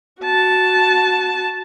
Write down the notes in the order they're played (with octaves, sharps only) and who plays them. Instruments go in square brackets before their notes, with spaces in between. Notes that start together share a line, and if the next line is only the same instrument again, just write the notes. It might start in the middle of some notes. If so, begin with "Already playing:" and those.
[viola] F#4 A5